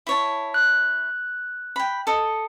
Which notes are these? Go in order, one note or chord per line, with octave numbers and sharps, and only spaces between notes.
E4 C#5 A5
F#6
G5 B5
A4 D#5